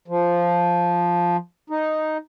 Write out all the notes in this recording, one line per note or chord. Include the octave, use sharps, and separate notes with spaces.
F3
D#4